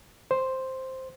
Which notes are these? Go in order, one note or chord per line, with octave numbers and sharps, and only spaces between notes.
C5